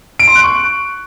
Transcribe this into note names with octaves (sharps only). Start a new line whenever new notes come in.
D7
C6
F#6
C#6